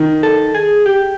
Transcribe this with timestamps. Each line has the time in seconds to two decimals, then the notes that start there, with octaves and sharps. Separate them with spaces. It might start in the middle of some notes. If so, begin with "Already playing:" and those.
Already playing: D#3
0.23 A4
0.55 G#4
0.86 G4